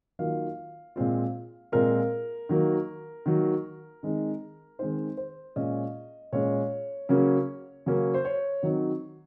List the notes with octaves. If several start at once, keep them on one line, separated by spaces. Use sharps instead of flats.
D#3 F#3 A#3 F4 F5
A#2 G#3 C4 F4
A#2 G#3 C4 F4 A#4
D#3 F#3 A#3
D#3 F#3 A#3
D#3 G#3 C4 D#4
D#3 G#3 C4 D#4 C5
C5
A#2 G#3 C#4 D#5
A#2 G#3 C#4 C#5
C#3 F#3 A#3 C#4
C#3 F#3 A#3 C#4
C5
C#5
D#3 F#3 C4 D#4